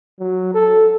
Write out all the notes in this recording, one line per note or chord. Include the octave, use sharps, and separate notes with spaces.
F#3
A4